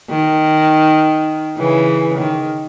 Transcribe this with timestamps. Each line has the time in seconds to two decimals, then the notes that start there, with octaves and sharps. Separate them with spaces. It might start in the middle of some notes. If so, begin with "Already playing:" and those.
0.10 D#3
1.58 C#3 E3
2.18 D#3